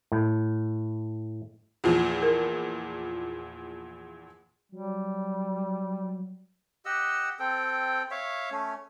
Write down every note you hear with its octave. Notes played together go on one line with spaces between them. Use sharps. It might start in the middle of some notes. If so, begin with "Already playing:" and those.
A2
E2 A#2 F3
A#4
F#3 G3
G4 D#5 F#5 E6
C4 A4 G5
C#5 E5 F5
A3 C#4